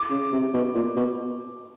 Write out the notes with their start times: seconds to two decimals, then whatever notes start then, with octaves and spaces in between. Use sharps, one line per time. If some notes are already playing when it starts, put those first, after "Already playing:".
Already playing: D6
0.10 C#3
0.32 C3
0.54 B2
0.74 A#2
0.96 B2